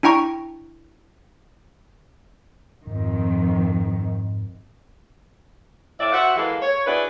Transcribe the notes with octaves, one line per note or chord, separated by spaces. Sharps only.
D4 E4 G5 A#5 C#6
F2 G#2 D#3
A2 D5 E5
F#4 C5 E5 F#5
E3 G#3 A#3 A4 B4 F5
C#5
D4 E4 F#4 G#4 B4